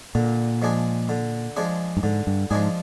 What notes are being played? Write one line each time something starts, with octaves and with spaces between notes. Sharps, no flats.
A#2 D3
F3 G#3 D4 G#4
D3
F3 G#3 D4 G#4
G2
G#2 D3
G2
G#2 F3 G#3 D4 G#4